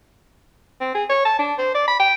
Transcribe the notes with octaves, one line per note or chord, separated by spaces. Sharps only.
C4
G#4
C#5
A5
D4
C5
D5
B5
G5